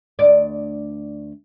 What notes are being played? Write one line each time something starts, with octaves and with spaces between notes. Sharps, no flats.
D2 D5